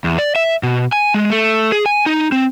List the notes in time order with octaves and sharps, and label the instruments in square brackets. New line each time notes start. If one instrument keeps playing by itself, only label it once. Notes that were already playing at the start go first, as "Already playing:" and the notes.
[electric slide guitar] E2
D5
E5
B2
G#5
G#3
A3
G#4
G#5
D#4
C4